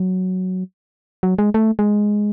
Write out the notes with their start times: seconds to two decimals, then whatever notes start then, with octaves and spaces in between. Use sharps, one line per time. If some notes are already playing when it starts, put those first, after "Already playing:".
Already playing: F#3
1.23 F#3
1.39 G#3
1.54 A3
1.79 G#3